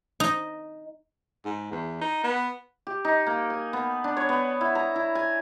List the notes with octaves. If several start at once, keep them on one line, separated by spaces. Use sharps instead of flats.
D#4
G#2
E2
D#4
B3
G4
D#4
A#3
G#5
B3
D4
C#5
B3
E4
A#5
E4
G#5